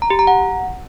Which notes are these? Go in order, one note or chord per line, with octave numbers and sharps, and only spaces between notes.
A#5
G4
A#5
F#5